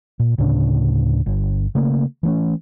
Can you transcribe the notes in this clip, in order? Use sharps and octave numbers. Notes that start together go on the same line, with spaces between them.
A#2
D2 A2 C#3 D4
G1
C#3 A3 A#3
E3 A3 C#4